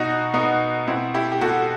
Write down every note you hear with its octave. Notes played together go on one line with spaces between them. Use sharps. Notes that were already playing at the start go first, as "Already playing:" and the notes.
Already playing: B2 D#4 F#4
B2 B3 D#4
B2 C4 E4
E4 G4
G4
B2 F#4 A4